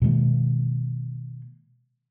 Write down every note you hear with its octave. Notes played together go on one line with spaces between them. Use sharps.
B2 D#3 G#3 A#3